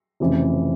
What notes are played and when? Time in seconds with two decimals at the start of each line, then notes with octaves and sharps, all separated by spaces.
0.20 F1 F2 C#3 E3